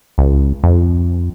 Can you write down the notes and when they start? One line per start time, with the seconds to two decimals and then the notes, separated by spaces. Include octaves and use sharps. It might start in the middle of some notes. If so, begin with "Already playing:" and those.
0.18 C#2
0.64 F2